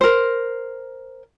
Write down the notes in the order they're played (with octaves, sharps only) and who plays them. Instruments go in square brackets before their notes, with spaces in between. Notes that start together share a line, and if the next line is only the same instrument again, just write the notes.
[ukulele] A#4 C5